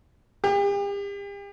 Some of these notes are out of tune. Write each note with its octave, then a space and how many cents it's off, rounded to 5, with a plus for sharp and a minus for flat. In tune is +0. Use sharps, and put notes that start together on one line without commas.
G4 +40